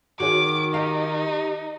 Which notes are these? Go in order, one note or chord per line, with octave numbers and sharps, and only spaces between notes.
D#3 F#4 G#4 C#5 D6
D#4 G4 F5